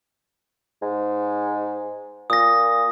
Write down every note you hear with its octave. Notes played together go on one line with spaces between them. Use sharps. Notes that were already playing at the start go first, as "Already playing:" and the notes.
G#2
A#2 D#6 A#6